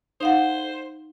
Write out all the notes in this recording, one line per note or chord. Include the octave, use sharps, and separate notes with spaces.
D#4 C5 F5 F#5